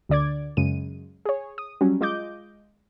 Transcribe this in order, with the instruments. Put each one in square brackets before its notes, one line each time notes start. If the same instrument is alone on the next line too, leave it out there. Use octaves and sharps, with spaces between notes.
[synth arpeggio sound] D2 D3 D5 D6 G#6
F#2 C#3 G#3 D#7
G#4 C#5
D#6
F#3 G3 C#4
G#3 F4 D#5 D6 G6